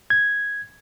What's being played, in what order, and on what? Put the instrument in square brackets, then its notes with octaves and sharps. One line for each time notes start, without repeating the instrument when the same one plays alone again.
[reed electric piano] G#6